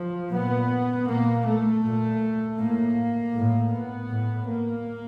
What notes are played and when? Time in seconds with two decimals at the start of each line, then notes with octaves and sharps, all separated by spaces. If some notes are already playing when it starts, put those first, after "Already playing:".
Already playing: F3
0.31 A#2 B3
1.08 A#2 A#3
1.46 A3
1.83 A#2
2.58 A2 A#3
3.34 A2
3.72 B3
4.10 A2
4.48 A#3